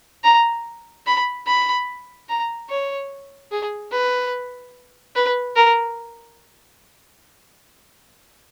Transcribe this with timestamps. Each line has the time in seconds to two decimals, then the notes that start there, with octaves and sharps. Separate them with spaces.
0.24 A#5
1.07 B5
1.47 B5
2.29 A#5
2.70 C#5
3.51 G#4
3.92 B4
5.16 B4
5.56 A#4